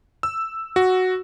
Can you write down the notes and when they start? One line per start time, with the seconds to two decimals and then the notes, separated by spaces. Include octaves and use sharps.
0.23 E6
0.76 F#4